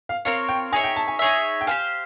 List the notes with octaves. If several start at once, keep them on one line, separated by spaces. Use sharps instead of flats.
F5
C4 F4 A#4 C#5 F5
G5
D#4 G#4 C#5 E5 G#5
G5
A5
G#5
D#4 G#4 C#5 E5
G5
G4 C5 F5 G#5